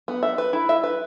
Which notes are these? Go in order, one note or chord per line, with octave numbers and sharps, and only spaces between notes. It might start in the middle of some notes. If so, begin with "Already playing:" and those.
B3
E5
B4
E4
E5
B4